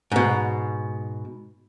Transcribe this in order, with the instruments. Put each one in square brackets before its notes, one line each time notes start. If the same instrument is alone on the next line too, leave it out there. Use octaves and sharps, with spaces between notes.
[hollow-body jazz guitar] G#2 B2